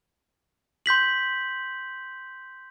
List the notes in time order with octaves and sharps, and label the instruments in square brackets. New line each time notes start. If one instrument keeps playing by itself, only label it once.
[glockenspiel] C6 G6 B6 F#7